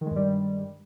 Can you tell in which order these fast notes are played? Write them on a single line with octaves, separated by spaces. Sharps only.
D#3 G#3 G2 G3